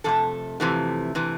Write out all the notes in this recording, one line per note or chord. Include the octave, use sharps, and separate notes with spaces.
F2 C3 A3 A4
F2 C3 E3 A3
C3 E3 A3